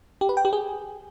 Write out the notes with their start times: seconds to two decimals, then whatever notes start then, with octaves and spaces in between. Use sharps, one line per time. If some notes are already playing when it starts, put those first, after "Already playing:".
0.21 G4
0.29 B4
0.37 G5
0.45 G4
0.53 G#4